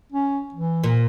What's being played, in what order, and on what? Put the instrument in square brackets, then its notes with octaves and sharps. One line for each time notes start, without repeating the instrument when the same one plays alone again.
[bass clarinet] C#4
E3
[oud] A#2